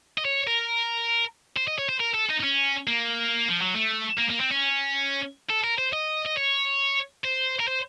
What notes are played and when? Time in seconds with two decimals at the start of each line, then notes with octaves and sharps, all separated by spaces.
0.18 D#5
0.25 C#5
0.47 A#4
1.56 C5
1.68 D#5
1.78 C#5
1.89 C5
2.00 A#4
2.14 A4
2.29 D#4
2.40 D#4
2.43 C#4
2.88 A#3
3.49 F3
3.61 F#3
3.75 A3
4.18 A#3
4.29 A#3
4.40 C4
4.51 C#4
5.49 A4
5.64 A#4
5.78 C5
5.93 D#5
6.25 D#5
6.37 C#5
7.24 C5
7.60 A#4
7.68 C5